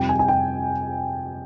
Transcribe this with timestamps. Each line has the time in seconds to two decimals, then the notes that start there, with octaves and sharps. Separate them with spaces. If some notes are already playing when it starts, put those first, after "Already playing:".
Already playing: F2 C3 G3 C4 G5
0.09 G#5
0.19 G#5
0.28 G5